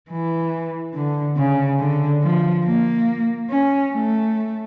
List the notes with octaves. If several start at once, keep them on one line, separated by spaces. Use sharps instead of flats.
E3
D3
C#3
D3
F3
A#3
C#4
A3